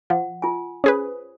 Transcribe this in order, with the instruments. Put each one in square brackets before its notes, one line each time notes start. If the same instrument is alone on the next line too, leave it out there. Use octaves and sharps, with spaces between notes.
[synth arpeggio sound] F3 [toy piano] F#5
[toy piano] F4 G#5
[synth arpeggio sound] C#4 G#4 B4 [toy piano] C5 D#6